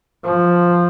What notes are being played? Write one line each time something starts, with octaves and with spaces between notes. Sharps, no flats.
F3